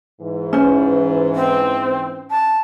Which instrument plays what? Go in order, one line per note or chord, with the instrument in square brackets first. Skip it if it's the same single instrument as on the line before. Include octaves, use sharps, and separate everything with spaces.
[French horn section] G#2 E3
[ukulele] C#4 C5
[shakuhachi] C4
A5